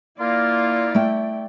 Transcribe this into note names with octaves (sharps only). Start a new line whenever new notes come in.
A#3 E4 F4 D5
A3 G5